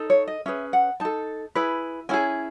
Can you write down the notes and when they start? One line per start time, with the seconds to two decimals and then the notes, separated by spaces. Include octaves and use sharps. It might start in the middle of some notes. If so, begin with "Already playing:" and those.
Already playing: D#4 A4
0.10 C#5
0.28 D#5
0.46 C#4 G#4 B4 E5
0.73 F#5
1.00 D#4 A4 A5
1.55 E4 G#4 B4
2.09 C#4 E4 G#4 G#5